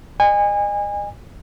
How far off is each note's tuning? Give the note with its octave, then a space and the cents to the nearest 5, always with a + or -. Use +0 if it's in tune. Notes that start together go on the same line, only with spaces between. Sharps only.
D#5 -35 G#5 -30